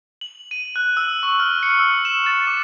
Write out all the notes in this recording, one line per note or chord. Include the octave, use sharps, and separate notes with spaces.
F#7
D#7
F#6
E6
C#6
F6
C#7
E6
E7
A6
D6